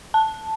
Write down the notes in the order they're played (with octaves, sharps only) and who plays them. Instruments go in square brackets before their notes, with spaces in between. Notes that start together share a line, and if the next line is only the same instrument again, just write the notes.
[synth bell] A5